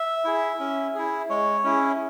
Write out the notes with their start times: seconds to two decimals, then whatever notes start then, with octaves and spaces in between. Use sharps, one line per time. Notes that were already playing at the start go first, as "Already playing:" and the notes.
Already playing: E5
0.25 E4 G#4
0.59 C#4
0.95 E4 G#4
1.29 G#3 C#5
1.64 C#4 E4 G#4